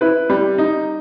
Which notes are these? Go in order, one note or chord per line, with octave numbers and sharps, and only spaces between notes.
E4 B4
G3
D#4